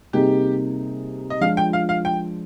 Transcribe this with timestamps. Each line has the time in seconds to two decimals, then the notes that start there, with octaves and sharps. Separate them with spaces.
0.13 C3 G3 A#3 D#4 G4 G#4
1.30 D#5
1.41 F3 G#3 D4 F4 F5
1.57 G5
1.73 F5
1.89 F5
2.05 G5